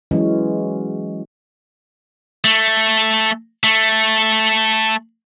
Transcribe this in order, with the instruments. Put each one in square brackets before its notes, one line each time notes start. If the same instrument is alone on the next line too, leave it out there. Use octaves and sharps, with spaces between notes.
[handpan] E3 F#3 G#3 C#4
[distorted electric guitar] A3
A3